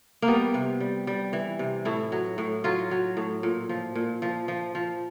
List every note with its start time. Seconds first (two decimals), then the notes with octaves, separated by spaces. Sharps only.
0.22 A#3
0.28 G3 B3
0.54 C3
0.80 G3
1.07 G3
1.33 E3
1.59 C3
1.85 A2 E4
2.12 F#3
2.38 A2
2.64 F#3 F4
2.91 F#3
3.17 A2
3.43 A#2
3.69 F3
3.95 A#2
4.22 F3
4.48 F3
4.75 F3